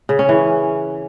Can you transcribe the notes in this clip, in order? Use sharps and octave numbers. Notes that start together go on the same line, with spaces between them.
C#3
C#4
E3